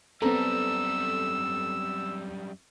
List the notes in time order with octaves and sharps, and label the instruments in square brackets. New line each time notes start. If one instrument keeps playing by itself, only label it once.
[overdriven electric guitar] F#2 G3 [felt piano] B3 C4 A#5 [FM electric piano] A4 [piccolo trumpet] E6